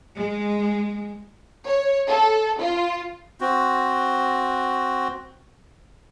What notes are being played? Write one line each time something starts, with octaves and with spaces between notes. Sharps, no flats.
G#3
C#5
A4
F4
C4 F#4